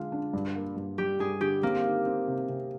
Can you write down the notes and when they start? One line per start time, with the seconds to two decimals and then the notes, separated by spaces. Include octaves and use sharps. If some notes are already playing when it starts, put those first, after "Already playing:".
Already playing: D3 G#3 D4 F4
0.12 D4
0.33 G2
0.55 A#3
0.76 G2
0.98 G3 G4
1.20 G2 G#4
1.41 D3 G4
1.63 A#3 C4
1.84 D#3
2.06 C4
2.28 C3
2.49 C3